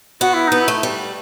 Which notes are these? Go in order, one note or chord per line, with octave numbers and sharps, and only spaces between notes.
B3 F#4
E4
B3 D#4
E4
A3
G3